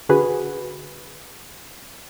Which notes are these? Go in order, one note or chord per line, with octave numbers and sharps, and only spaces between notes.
D3 F#4 G#4 B4